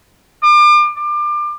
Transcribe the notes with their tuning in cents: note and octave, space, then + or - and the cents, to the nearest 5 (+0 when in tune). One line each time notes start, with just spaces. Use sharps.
D6 +35
D6 +30